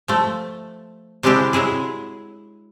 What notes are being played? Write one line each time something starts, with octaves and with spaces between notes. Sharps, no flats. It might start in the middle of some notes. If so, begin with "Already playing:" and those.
F3 A3
C3 G3 G#3 D4 E4 G4
F#3 G#3 E4 G#4